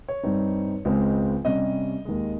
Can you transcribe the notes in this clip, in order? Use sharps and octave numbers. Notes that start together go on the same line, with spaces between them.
C#5
G2 G3 C4 D#4
C#2 C#3 G#3 C4
C3 G3 C#4 D#5
D#2 D#3 G#3